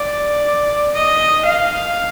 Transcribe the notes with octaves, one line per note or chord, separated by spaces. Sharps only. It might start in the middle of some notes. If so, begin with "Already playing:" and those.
Already playing: D5
D#5
F5